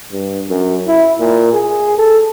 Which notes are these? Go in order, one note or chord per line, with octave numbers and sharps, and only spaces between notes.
G2
F#2
E4
A#2
G#4
A4